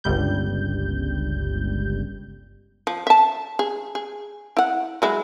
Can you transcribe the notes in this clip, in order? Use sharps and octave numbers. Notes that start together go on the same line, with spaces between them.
G1 C#2 G3 G6
F3
E5 A5
G#4
G#4
E4 F#5
F#3 G#3 E4